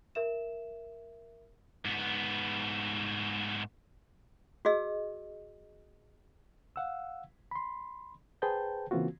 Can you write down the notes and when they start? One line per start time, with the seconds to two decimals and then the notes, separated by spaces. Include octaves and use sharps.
0.15 A#4 E5 E7
1.85 G#2 B3
4.65 F#4 G#4 D#5 E6
6.76 F5 F#5 E6
7.51 B5 C6
8.42 G#4 B4 C5 G5 A5 G6
8.91 C#3 E3 A#3 C4 F4 F#4